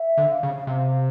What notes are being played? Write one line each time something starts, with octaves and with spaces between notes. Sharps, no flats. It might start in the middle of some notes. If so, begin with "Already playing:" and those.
Already playing: E5
D3
F5
C#3
C3